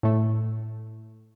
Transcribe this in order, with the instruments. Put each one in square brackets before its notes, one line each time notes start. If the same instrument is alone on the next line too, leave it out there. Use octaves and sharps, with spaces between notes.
[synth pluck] A2 A3